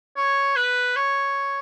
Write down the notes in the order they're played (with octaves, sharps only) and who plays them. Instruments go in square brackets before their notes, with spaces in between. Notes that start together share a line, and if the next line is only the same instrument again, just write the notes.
[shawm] C#5
B4
C#5